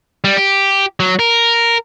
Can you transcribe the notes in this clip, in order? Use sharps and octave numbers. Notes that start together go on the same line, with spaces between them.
G3
G4
F#3
A#4